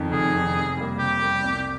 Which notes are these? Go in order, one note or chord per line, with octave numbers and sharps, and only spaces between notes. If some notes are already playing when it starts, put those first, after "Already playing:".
Already playing: F2 D#3
F1 G#4
F2 D#3
C3
G3 A#3
C3 G4
G3 A#3
C2